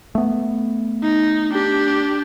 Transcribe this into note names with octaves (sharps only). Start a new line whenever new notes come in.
A3 B3
D#4
D4 G4